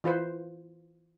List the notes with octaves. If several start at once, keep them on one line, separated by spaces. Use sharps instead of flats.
E3 F4 B4 C5